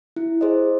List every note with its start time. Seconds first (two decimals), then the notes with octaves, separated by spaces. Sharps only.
0.16 E4
0.41 G#4 C5 D#5